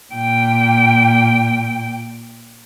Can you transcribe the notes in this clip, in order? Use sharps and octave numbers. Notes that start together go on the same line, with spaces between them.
A#2 G5